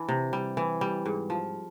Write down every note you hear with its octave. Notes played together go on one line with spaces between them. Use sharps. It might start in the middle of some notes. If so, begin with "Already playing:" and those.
Already playing: E3 D4 E4
C3
G3
E3
G3
G#2
F3